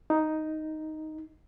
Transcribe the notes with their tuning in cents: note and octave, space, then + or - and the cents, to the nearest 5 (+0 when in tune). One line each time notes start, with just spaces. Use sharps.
D#4 +0